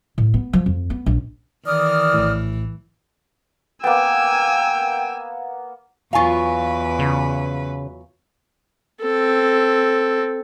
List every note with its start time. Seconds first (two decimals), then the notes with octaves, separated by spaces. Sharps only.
0.18 A2
0.34 B3
0.53 F3
0.66 F2
0.90 B3
1.06 A#1
1.67 D#3 E3 D5 D#6 F6
2.14 A#1 A2
3.84 A#3 B3 G5 G#5 E6
6.13 E2 F#3 F4 B4 F5 G#5 C#6
6.99 C#3
9.01 C4 A4